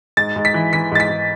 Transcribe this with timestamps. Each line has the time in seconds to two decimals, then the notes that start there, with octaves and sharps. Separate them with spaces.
0.17 G#2 A6
0.36 G#2
0.45 B6
0.54 E3
0.73 E3 B6
0.92 G#2 A6
1.00 B6
1.09 G#2